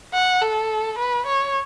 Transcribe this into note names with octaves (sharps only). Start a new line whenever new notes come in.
F#5
A4
B4
C#5